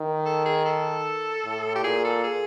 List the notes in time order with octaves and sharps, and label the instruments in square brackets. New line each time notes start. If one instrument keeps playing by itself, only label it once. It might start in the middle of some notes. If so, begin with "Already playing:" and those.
Already playing: [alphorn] D#3
[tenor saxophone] A4
G#4
A4
[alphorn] A2
[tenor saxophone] G4
[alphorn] A#2 [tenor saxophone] G#4
[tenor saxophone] A4
G#4